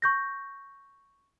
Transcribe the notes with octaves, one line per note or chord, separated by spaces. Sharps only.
C#6 G6 A#6